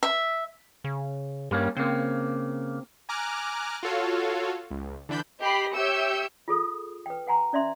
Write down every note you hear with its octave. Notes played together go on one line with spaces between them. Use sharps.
E5
C#3
G2 G3 A#3 C#4
C#3 A#3 C4
G#5 A#5 D6 F6 F#6
F4 F#4 A4 C#5 F5
C#2
D3 E3 D4 B5 G6
G4 D#5 B5 C7
G4 C#5 E5 E6 G6 C#7
F4 G#4 A4 D#6
B4 G5
B4 F#5 G#5 A#5 C6
C#4 D5 E5 C6